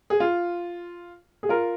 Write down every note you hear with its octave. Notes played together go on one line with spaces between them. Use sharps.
G#4
F4
G#4
F4 A#4